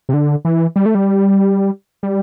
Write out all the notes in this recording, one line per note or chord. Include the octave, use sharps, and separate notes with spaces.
C3
D3
E3
G3
A3
G3
G3